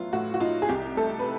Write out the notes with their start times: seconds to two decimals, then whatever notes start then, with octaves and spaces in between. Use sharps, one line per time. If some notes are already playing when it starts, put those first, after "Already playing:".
Already playing: A2 F#3 B3 E4 F4
0.13 A2 F#4
0.34 F#4
0.40 D#4 F4
0.62 G#4
0.69 C2 G4
0.97 A3 A4
1.19 B4